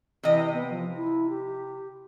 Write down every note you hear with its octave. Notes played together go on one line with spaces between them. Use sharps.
C3 E3 D#5
B3
F3
E4
G4